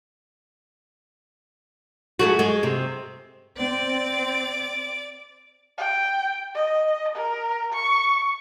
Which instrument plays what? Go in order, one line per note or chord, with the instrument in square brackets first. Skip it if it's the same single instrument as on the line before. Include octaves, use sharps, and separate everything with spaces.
[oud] G#3 A3 F#4
G#3
C3
[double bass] C4 [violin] D5 D6
[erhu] G5
D#5
A#4
C#6